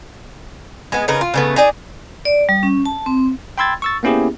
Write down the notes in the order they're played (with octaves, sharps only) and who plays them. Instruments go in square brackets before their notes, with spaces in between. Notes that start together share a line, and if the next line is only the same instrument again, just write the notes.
[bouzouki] G#3 B3
C#3 D#4 A#4 B4
F4
C#3 A3 B3
D#4 G#4 D5
[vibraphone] D5
G3
C#4
A5
C4
[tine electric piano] G5 B5 C6 E6 G#6 A6
C#6 E6 A6
A#3 B3 C#4 E4 G4 G#4